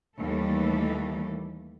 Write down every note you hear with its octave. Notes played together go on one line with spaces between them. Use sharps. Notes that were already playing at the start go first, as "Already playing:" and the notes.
D#2 E3 G3 A3 A4